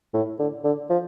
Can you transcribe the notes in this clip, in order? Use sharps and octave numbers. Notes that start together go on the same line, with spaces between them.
A2
D3
D3
F3